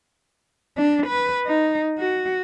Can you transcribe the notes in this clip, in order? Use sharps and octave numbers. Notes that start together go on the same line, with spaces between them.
D4
B4
D#4
F#4